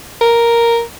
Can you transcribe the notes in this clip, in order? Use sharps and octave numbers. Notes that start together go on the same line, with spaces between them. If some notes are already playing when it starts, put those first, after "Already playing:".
A#4